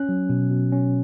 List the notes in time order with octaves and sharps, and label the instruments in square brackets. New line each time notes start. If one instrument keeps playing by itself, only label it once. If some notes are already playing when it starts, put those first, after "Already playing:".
Already playing: [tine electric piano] C#4 F#6
F#3
B2
B2
C#4